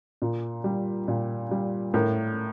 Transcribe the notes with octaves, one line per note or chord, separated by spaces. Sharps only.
A#2
G3
A#2
G3
A2 A#4